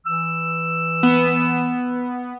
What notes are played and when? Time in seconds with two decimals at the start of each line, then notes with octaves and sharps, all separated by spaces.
0.06 E3 E6
1.03 B3